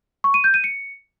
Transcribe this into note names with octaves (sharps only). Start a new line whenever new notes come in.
C#6
D#7
G6
D#7
C#7